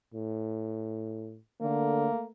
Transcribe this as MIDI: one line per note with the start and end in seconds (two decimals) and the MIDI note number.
0.14 1.39 45
1.61 2.08 50
1.61 2.31 57
1.61 2.25 58